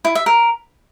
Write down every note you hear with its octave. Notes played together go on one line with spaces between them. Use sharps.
E4
E5
A#4